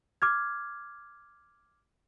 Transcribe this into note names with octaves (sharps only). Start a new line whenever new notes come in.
D6 F6 G#6